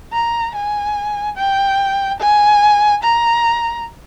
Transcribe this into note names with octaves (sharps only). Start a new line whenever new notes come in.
A#5
G#5
G5
G#5
A#5